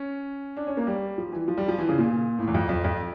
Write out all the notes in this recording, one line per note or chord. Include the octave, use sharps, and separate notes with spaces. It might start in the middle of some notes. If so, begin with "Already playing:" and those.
Already playing: C#4
D4
C#4
A#3
G3
F3
E3
F3
G3
F3
E3
C#3
A#2
A2
E2
F2
F2
F2